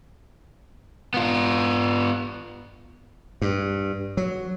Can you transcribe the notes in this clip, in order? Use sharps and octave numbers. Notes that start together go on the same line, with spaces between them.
B3 F4
G2
F#3